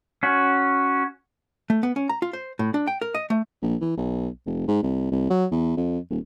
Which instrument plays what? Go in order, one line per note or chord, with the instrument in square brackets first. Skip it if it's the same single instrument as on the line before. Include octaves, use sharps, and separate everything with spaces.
[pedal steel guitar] C#4 F#4
[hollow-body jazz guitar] A3
B3
C#4
A#5
F4
C5
A2
D4
G5
A#4
D#5
A3
[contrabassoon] A#1
E3
B1
F1
G#2
C2
C2
F#3
E2
F2
D#1